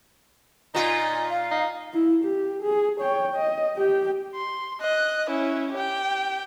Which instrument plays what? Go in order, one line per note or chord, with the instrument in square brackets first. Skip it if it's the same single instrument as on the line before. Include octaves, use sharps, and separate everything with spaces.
[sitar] A#2 F4 [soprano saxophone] D#4 [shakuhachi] G#5
[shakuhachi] F5
[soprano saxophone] D#4
[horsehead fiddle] E4
G4
G#4
C#5 G5
D#5
G4 G5
[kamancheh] C6
D#5 F#6
C#4 E4
G4 G5